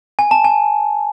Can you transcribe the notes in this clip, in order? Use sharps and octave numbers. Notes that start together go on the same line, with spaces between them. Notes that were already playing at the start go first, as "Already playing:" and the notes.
G#5
A5
G#5